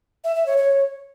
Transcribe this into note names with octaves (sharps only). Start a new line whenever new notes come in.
E5
E5
C#5
C#5